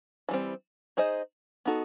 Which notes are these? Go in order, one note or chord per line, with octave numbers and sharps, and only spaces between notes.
E3 G3 C4
D#4 G#4 C5 D#5
B3 D#4 F#4 A4